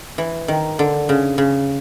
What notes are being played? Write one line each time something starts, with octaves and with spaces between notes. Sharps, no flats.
E3
D#3
D3
C#3
C#3